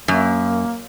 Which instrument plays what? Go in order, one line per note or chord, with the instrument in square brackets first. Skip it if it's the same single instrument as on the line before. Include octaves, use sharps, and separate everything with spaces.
[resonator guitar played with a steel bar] F#2 [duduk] A#3